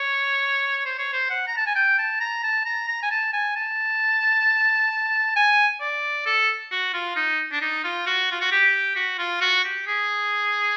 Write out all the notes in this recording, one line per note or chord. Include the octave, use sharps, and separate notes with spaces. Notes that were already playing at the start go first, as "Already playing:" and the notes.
Already playing: C#5
C5
C#5
C5
F#5
A#5
A5
G#5
G5
A5
A#5
A5
A#5
A#5
G#5
A5
G#5
A5
G#5
D5
A4
F#4
F4
D#4
D4
D#4
F4
F#4
F4
F#4
G4
F#4
F4
F#4
G4
G#4